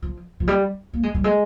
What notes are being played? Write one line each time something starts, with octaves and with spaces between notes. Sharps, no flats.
F3
F3
G3
A#3
G#3
G3
G#3